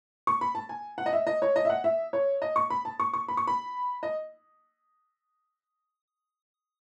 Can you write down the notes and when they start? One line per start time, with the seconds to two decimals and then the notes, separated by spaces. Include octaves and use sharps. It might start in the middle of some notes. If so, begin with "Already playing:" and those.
0.27 C#6
0.41 B5
0.55 A5
0.69 G#5
0.98 F#5
1.06 D#5
1.13 E5
1.27 D#5
1.42 C#5
1.56 D#5
1.65 E5
1.70 F#5
1.84 E5
2.13 C#5
2.42 D#5
2.56 C#6
2.70 B5
2.85 A5
3.00 C#6
3.13 C#6
3.28 B5
3.37 C#6
3.47 B5
4.03 D#5